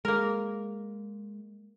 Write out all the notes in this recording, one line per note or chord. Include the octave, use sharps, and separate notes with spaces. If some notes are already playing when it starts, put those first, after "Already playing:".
G#3 A#3 A#4